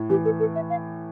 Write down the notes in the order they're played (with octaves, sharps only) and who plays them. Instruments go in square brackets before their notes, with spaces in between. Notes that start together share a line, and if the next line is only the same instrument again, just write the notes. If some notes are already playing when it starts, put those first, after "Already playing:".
Already playing: [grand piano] A2
[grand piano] E3 [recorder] G4
[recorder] A4
A4
E5
F5